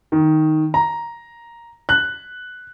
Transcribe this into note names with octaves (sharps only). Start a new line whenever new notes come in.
D#3
A#5
F#6